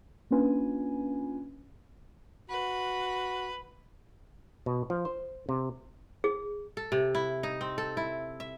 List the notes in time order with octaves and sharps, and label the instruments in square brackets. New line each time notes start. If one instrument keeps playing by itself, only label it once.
[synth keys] A#3 C#4 D4 F4 B4 G#5
[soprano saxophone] F#4 [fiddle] B4
[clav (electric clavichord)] B2
F3
C5
C3
[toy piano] G#4
[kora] A4
C3
E4
D#4
C4
A4
E4
E5